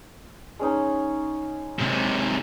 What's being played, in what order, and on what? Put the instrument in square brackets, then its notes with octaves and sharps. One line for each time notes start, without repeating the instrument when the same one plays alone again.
[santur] G#3 C#4 D#4
[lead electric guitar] G#2 C3